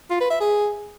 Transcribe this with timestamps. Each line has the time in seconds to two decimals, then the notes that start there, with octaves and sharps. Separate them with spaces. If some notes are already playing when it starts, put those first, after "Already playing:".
0.10 F4
0.20 B4
0.30 E5
0.40 G#4